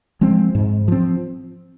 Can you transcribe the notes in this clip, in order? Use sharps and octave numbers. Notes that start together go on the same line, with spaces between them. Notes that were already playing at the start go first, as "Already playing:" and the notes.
F3 G#3 C4
G#2
F3 C4